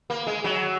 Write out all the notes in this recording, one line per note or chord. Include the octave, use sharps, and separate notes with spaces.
A#3
G#3
F#3